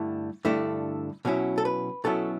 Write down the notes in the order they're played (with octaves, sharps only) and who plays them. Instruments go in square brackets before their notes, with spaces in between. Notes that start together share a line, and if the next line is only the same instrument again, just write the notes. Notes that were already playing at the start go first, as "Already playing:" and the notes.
Already playing: [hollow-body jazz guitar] G2 D3 A3 E4
G2 D3 A3 E4
B2 F#3 C#4 E4
A4
B4
B2 F#3 C#4 E4 A4